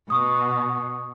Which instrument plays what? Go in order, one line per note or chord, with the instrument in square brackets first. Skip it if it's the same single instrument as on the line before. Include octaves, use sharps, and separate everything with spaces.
[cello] B2 [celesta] C#6 D#6